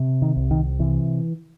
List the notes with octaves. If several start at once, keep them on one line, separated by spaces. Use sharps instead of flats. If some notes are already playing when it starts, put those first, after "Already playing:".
Already playing: C3
D#3
C2
D#3
C3 E3